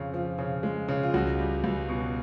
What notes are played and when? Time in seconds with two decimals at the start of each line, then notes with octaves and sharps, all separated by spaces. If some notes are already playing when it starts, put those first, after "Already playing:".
Already playing: F2 C#3 F4
0.14 F3
0.39 C#3
0.63 G#3
0.88 C#3
1.03 F4
1.14 C#2 F#4
1.39 G3
1.64 C#2
1.89 B2